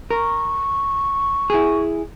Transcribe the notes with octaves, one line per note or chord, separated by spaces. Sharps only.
A#4 C#6
E4 G#4